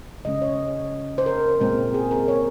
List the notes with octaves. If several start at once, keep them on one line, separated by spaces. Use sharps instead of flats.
C#3 G#3 C#4 D#5
C#5
C5
A#4
A#2 G#3 C4
G#4
A#4
C#5